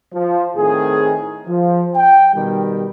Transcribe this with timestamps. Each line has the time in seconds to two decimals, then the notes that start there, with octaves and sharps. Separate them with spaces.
0.13 F3
0.56 A2 D#3 C4 G#4
1.47 F3
1.96 G5
2.34 B2 D#3 G3